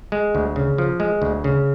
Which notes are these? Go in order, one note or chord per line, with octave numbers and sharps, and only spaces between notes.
G#3
D2
C#3
F3
G#3
D2
C#3